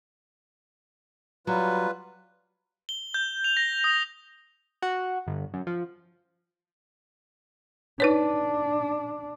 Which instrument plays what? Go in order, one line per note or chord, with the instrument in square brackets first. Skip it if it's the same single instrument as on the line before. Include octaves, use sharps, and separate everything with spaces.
[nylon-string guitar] F#3 [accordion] G3 F4 B4
[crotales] G7
G6
F7
A#6
D#6
[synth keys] F#4
G1
F#2
F3
[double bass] D4 [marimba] D#4 B4 C#5